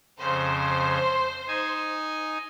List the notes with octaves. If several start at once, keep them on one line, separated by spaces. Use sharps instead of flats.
F2 C#3 C5
D#4 G#5